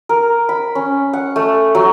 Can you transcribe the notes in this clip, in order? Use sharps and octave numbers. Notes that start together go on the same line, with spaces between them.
A#4
B5
C#4
F#5
A3
F#3